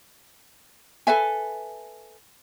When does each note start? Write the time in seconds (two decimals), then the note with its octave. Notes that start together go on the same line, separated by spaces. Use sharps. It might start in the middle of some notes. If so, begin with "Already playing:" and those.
1.07 A4 B4 E5 G#5